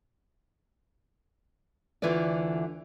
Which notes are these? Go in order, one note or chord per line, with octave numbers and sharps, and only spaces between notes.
D2 D3 E3 F4 B4 D5